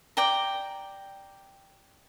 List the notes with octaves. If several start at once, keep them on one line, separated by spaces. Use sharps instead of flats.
D5 G5 A#5